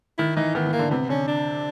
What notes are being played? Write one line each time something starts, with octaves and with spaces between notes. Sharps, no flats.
D#3 E4
E3 D#4
D#3 B3
D#3
A#3
D3
C3 B3
D3 C#4
D4